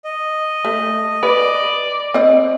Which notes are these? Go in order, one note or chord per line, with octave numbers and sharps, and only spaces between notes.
D#5
A3
B4 D5
C4 D#5